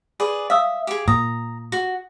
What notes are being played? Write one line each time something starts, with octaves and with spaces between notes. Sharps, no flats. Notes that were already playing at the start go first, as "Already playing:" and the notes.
G#4 B4 D5
E5 F5 D#6 E6
G4 G#4
A#2 A#5 D#6
F#4